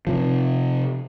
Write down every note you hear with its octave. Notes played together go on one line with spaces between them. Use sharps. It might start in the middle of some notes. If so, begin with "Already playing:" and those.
C3 F3